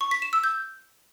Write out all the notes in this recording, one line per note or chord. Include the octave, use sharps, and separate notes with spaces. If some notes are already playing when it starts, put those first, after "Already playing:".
C#6
B6
E7
E6
G6